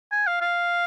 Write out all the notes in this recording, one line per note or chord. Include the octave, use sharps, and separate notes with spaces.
G#5
F5
F5